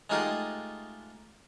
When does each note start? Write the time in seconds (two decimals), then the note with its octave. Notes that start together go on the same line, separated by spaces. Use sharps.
0.10 G#3 A3 D#4 F4 G4 G#4